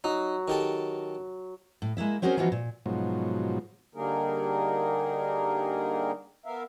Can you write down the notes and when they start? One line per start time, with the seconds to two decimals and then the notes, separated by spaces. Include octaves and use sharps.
0.04 F#3 D#4
0.48 D#3 G4 A4
1.82 A2
1.97 G#3 A#3 E4 E5
2.22 C4 C#4 F#4 G#4 A#4 C5
2.37 E3 F3 B3 D#4 F4 F#4
2.52 A#2
2.86 G#2 B2 F3 F#3
3.95 D3 G3 A#3 D#4 G#4 A#4
6.45 B3 A#4 E5 F5